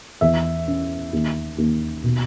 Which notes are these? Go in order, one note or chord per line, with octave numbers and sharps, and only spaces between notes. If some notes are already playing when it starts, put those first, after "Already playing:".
E2 E5
C#4
D#2
D#2
B2